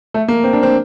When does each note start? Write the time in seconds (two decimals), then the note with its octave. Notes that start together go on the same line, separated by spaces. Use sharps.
0.14 A3
0.28 A#3
0.44 C4
0.53 D4
0.63 C4